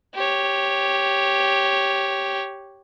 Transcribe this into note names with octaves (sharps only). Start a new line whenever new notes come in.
G4 C#5